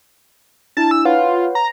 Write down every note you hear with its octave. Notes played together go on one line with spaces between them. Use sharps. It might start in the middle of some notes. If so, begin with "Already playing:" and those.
D4 E4 A5
G#5 E6
F4 B4 C#5 F#5
A#5